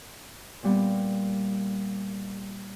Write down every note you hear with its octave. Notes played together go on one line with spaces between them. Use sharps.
A#2 G3 B3